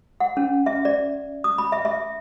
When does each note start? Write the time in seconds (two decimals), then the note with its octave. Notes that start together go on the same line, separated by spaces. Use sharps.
0.20 F#5
0.37 C#4
0.66 E5
0.85 D5
1.44 D#6
1.58 B5
1.72 E5
1.85 E5